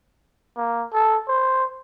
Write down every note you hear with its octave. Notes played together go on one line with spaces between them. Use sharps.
A#3
A4
C5